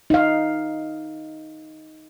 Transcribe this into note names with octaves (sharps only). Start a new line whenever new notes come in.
D#4 F5